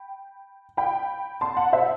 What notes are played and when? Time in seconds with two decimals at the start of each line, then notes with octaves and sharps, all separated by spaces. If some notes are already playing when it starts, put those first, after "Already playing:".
Already playing: G5 B5
0.77 G5 B5
1.41 A5 C6
1.57 F#5 A5
1.73 C5 E5